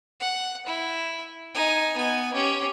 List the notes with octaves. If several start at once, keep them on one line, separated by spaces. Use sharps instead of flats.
F#5
E4
D#4 G#5
B3 G#5
C#4 G4